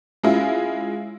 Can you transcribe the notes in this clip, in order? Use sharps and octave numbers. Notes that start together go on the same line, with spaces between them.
G#3 C#4 E4 F4